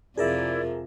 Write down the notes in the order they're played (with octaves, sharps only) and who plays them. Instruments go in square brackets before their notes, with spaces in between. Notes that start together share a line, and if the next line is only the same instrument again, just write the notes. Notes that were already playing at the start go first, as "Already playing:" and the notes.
[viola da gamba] F2 C3 F3 [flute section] E4 D5 [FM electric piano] G#4 A#4 E5